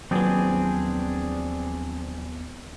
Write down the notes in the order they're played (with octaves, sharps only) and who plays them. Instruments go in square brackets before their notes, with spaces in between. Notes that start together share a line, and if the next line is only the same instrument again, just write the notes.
[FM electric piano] D#2 F3 B3 [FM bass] F#3 [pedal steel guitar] C4 D4 G#4